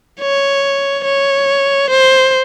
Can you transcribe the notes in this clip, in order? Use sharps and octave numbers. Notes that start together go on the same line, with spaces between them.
C#5
C#5
C5